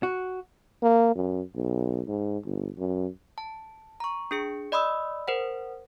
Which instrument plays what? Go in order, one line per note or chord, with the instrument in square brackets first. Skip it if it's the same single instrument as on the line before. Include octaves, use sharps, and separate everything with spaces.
[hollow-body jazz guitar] F#4
[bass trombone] A#3
F#2
B1
G#2
G1
F#2
[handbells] A5
A#5 C#6
D4 G#4 C#7
D5 D#5 B5 C6 D#6 E6
A#4 C5 F#5